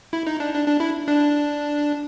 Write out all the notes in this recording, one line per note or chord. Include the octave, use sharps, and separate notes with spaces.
E4
D#4
D4
D4
D4
E4
D4